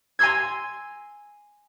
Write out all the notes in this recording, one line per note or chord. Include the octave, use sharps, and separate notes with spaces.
G#5 A#5 C6 E6 G#6